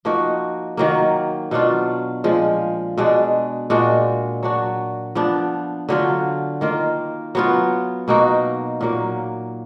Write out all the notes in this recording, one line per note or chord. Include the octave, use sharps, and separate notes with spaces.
F3 A#3 D#4 F#4
D#3 F#3 A#3
B2 F#3 D4 F4
A#2 F3 G#3
B2 G#3 D4
A#2 G#3 D4 F#4
F#3 D4 F#4
F3 B3 D4
D3 F#3 D4 F4
D#3 A#3 F4
F#3 B3 F4
B2 A#3 D#4 F#4
A#2 F#3 A#3